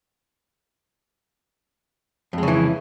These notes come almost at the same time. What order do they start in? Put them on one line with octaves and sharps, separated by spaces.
F2 G#3 C#3 E3